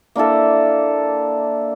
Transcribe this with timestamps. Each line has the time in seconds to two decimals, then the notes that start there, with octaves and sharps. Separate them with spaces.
0.15 A#3 D4 E4 A4